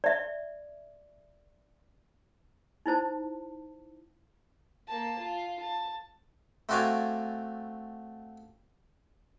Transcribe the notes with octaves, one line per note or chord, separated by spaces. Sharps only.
D5 E5
D#4 E4 C5 A5
A#3 A5
F4
A5
A3 C4 F#4 D5 F5 G#5